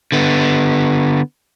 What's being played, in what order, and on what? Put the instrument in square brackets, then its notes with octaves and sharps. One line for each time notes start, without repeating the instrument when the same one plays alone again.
[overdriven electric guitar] D3 B3